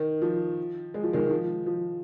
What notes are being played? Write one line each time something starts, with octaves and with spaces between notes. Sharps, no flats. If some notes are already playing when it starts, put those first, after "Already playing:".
Already playing: D#3
F3
G#3
F3
D#3 G#3
F3
F3